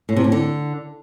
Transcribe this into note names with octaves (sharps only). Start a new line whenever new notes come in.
A2
C3
A2
D3